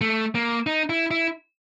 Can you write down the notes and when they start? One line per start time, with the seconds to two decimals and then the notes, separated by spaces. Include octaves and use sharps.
0.01 A3
0.35 A#3
0.67 D#4
0.90 E4
1.11 E4